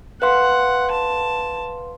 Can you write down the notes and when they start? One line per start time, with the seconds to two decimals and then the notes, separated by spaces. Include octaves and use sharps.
0.22 B4 F5 F#5 C6
0.92 A5